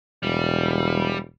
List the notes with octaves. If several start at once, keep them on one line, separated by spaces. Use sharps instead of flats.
E1 G3